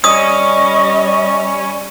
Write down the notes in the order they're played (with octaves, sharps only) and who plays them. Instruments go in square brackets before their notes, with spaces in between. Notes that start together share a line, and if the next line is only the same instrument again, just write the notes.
[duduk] G3 [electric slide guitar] C#4 [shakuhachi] D#5 [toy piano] D#6